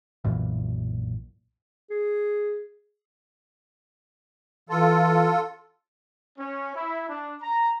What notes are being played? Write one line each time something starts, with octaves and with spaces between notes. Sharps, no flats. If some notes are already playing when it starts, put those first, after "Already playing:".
B1 F#2 A#2 E3
G#4
E3 F4 A4
C#4
E4
D4
A#5